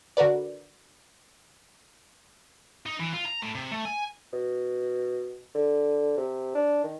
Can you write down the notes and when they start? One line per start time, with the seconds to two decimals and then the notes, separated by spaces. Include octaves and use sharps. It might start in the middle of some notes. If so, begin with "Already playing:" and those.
0.17 D3 F#4 A#4 B4 D5
2.86 D#4
3.00 E3
3.13 F4
3.26 A#5
3.43 A2
3.55 C3
3.72 A3
3.85 G#5
4.33 B2
5.55 D3
6.18 C3
6.55 D4
6.84 D#3